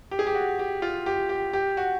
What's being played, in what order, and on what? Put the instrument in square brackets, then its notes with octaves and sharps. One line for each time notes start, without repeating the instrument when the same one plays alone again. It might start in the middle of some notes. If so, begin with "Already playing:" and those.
[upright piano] G4
G#4
G4
F#4
G4
F4
G4
G4
G4
F#4